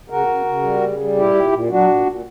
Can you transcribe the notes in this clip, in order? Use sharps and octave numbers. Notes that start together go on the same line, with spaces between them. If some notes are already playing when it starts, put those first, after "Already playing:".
C#3 F#4 A#4
C#3
C#3
G3
C#3
G3
A#2 E4 G4
A#2
A#2
F#3 D4 F#4
A#2
A#2